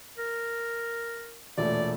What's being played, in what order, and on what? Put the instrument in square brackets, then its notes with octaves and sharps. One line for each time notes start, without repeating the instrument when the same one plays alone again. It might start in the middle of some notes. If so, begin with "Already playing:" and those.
[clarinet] A#4
[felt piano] E1 A#2 A3 [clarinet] D5